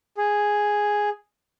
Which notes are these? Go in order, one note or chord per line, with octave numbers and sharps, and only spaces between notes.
G#4